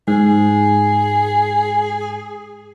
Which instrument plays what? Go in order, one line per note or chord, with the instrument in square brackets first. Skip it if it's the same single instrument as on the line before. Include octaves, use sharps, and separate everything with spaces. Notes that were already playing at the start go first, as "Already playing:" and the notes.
[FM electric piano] G#2 [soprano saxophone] G#4